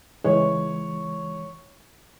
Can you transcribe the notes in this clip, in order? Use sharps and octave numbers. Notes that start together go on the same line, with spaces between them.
C#2 E3 G#3 C#5